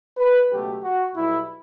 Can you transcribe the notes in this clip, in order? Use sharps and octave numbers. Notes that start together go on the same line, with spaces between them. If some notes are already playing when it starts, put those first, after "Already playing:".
B4
C#2 B2 F#3 A3 G4
F#4
B1 B2 G3 E4